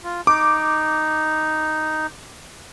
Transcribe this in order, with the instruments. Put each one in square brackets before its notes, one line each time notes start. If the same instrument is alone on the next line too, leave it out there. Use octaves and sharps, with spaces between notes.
[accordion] F4
[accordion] D#4 [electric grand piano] D6